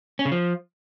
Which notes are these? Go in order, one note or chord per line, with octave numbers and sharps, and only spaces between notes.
C#4
C#3
F3